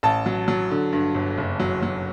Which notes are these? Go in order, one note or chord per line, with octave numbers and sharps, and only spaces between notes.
A1 A5
F#3
F#3
D3
G2
G1
F#1
F#3
F#3